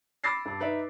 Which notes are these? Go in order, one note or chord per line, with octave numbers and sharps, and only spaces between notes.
B5 D6 E6 A6 A#6 C7
G2 A5
D#4 B4 D5 E5